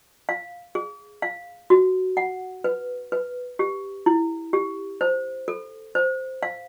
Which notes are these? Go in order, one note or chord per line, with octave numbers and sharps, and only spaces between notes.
F5
G#4
F5
F#4
F#5
B4
B4
G4
E4
G4
C5
A4
C5
F5